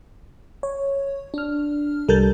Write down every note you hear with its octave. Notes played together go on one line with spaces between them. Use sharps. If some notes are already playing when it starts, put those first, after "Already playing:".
C#5
D4 F6
C2 G3 A4 A#4 G6 A6